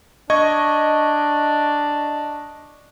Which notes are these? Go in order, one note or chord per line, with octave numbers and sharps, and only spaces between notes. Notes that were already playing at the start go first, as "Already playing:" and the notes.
D4 D#5 C#6 G#6